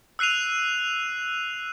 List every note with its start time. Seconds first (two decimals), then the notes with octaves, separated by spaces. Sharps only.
0.19 E6 F#6 C7 D#7 F7